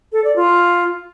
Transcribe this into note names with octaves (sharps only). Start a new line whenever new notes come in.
A4
D5
F4